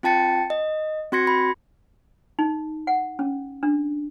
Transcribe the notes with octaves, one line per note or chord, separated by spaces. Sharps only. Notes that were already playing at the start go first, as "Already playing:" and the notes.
C4 F4 G5 A5 A6 C#7
D#5
C4 F#4 C6 G#6 A#6 C#7
B5
D#4
F#5
C#4
D4